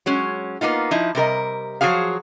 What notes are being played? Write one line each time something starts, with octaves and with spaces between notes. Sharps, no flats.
F#3 G#3 C#4
A#3 B3 D#4 F4
F3 D#4 E4
C3 G3 A#4 D#5
F3 F#3 F#4 G#4 F5